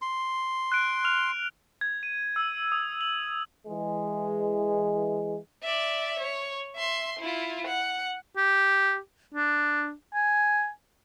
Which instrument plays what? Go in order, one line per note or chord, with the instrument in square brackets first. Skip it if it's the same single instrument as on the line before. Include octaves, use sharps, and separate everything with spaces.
[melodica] C6
[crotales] F#6 D7
F6 F7
G#6
D#7
E6
D#6
F#7
[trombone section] E3 G#3
[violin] D5 E5
C#5
E5 C6
E4 F4
F#5
[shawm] G4
D4
G#5